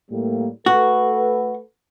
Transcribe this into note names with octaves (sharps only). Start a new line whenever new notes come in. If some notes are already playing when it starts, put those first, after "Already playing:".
A2 G3 A#3
A3 F#4 A4 B4